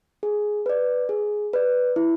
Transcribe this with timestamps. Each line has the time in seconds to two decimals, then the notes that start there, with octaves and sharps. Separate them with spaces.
0.23 G#4
0.66 B4 D5
1.09 G#4
1.53 B4 D5
1.96 E4